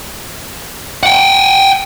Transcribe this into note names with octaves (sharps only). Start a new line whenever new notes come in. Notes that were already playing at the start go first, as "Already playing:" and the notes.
F#5 G5